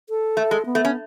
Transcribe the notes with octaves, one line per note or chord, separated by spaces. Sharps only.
A4
A3
G#3
B3
A3
C#4